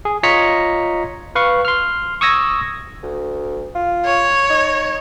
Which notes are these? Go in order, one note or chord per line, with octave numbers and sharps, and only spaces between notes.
G#4
F4 C#5 D#5 A#5 B6 C#7
B4 F5 C#6
C6 F6
C#6 D#6 E6 G#6 A#6
D2
F4
C#5
D#4